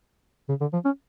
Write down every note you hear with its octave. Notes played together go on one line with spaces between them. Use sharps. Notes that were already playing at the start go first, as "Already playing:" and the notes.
C#3
D3
F3
C#4